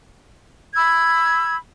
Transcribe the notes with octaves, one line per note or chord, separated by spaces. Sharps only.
B5 E6 G#6